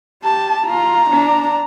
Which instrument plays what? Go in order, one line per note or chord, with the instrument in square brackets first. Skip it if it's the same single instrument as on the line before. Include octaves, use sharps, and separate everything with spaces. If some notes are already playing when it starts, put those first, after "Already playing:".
[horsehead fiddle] G4 [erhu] A5
[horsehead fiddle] F4 [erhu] A#5
[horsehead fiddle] D4